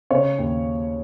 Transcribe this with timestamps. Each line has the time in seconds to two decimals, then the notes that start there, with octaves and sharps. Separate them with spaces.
0.11 C#3 C#5
0.38 D#2